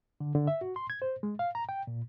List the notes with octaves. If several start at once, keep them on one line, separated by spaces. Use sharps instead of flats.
D3
D3
E5
F#4
C6
G#6
C5
G#3
F5
A#5
G5
A#2